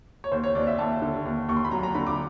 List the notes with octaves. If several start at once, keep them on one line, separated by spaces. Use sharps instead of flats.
C#5
D#2 C5
C#5
D#2 D5
E5
D#2 A5
D3
D#2
D#2 C#6
C6
B5
F#3 A#5
A#5
D3 B5
D6